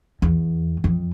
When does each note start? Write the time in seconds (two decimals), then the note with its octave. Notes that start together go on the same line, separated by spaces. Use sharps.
0.22 E2
0.84 F2